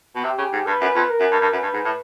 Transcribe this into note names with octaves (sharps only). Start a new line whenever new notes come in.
B2
C3 G4
C#3
G#2
G2 B4
F#2
F2
A#4
F#2
G2
G2
F#2 B4
G2
G#2
A2